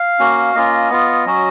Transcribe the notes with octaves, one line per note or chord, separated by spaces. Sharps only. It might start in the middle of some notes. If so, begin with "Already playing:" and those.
Already playing: F5
A#3 C#4 F#4
A#3 C#4 F4 D#5
B3 F4
F#3 C#4 F#4